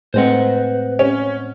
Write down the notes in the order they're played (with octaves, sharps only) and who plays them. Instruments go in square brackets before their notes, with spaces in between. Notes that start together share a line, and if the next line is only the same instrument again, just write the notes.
[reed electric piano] A2 G#3 C4 [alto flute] B4 [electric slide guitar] C5 D#5 F#5
[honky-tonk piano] C#4